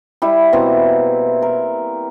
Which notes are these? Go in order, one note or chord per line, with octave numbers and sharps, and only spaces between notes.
G3 E4 E5
B2 A#3 C4 E4
A#4